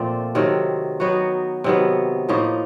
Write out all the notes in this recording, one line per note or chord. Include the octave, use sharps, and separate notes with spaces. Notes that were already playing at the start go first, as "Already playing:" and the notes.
Already playing: A#2 F3 A3 C4
C3 D#3 F#3 A3
F#3 B3 D#4 F#4
C3 D#3 F#3 B3
A2 F3 A#3 D#4